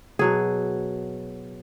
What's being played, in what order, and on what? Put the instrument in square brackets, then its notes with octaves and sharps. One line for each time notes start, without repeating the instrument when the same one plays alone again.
[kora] B2 F#3 G#4